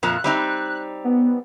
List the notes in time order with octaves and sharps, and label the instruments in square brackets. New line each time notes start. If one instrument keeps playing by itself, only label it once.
[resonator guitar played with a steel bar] F2 A#2 F3 [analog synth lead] F#6
[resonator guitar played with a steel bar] G3 C4 D#4
[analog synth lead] B3